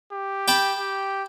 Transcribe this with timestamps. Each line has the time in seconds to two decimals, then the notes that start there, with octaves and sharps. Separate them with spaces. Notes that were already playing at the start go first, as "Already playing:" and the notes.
0.12 G4
0.48 G5 A5 B5
0.78 G4